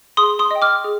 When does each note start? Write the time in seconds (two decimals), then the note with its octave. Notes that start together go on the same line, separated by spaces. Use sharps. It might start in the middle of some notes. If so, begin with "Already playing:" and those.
0.17 G#4 C6 D#6
0.39 C6 D#6
0.51 D#5 G5
0.62 D6 F6
0.84 G#4